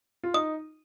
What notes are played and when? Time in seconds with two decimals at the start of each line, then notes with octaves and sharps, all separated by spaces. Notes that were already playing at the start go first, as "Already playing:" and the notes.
0.23 F4
0.34 D#4 D#6